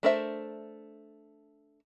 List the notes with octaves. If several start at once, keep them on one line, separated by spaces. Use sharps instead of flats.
A3 D4 A#4 C5 E5